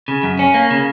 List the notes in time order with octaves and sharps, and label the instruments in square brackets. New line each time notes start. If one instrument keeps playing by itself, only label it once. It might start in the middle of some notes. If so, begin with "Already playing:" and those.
[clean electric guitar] C#3
F#2
C#4
A#3
C#3